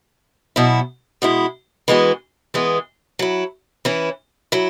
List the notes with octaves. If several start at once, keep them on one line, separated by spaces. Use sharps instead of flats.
B2 F#3 E4
B2 G#3 E4
E3 G#3 B3 F#4
E3 G#3 B3
F#3 E4
E3 C#4 E4
F#3 E4